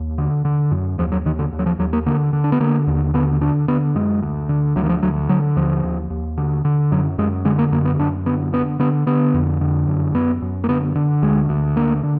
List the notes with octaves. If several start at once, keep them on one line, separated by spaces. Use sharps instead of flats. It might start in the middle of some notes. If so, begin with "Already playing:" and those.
Already playing: D#2
D3
D3
F#2
D#2 F3
F#3
D#2 D#3
D3
D#2
F#3
F3
D#2 F#3
A#3
D3 A#3
D3
D4
B3
D3 A#3
D#2
D3 B3
D3 D4
D3 B3
F#2 G#3
D2
D3
D2 F#3
D#3
F3
D2 F#3
D3 F#3
D#2 F3
D#2
D#2
D3
D3
F#2 F#3
F#2 G#3
D3 G#3
A#3
F#2 A#3
B3
F#2 D4
D3 B3
D3 B3
D3 B3
D3 B3
F2
D3
F#2
F#2 B3
F#2
A#3
D3 B3
D3
D2 G#3
D2
D3 A#3
D3